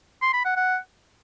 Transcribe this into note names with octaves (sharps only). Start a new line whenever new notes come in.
C6
B5
F#5
F#5